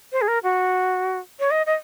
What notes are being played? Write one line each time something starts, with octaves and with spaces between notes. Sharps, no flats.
C5
G#4
A#4
F#4
C#5
D#5
D#5